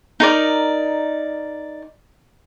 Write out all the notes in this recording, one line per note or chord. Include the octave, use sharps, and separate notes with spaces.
D#4 A#4 D5